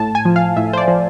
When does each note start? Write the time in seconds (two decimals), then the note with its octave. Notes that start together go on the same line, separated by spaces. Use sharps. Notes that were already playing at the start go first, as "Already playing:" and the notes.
Already playing: A2 A5
0.15 G#5
0.25 F3
0.36 F5
0.57 A2 E5
0.73 C5
0.77 D5
0.88 F3